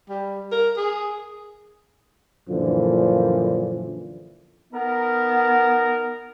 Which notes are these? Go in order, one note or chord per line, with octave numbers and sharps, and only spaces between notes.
G3
A#4
G#4
F#2 A#2 D3 E3 F3
B3 D#4 A#4